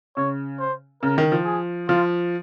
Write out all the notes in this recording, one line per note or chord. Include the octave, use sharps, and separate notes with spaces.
C#3 C#5
C5
C#3 A#4
D#3
F3
G#4
F3 F4